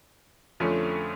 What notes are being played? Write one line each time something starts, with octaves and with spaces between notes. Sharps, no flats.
F2 D3 F3 A3 C#4